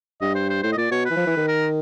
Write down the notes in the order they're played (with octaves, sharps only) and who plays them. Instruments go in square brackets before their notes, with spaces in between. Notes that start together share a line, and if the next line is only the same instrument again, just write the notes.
[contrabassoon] G2 [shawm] D#5
[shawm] C5
C5
[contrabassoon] A2 [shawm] C5
[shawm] D#5
[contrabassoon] A#2 [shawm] D5
[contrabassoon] B2 [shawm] C#5
[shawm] B4
[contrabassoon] E3
F3
E3
D#3
[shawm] A#4